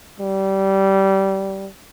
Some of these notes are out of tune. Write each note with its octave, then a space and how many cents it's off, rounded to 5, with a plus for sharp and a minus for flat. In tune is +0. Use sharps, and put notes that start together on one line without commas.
G3 -20